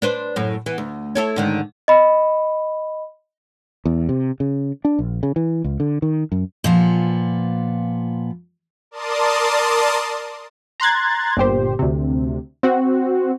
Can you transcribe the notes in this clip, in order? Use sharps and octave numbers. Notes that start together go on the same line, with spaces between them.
D4 B4 C5
F#2 A2
E3 B3
D2
E4 A4 C#5
G#2 D3 D#3
D#5 B5
E2
C3
C#3
D4
A#1
C#3
E3
C#2
D3
D#3
F#2
A#2 F3 B3
A#4 D5 A5 C6 D#6
A#5 C6 F#6 G#6 A6
G1 A#2 G4 C5
D2 C3
C4 F#4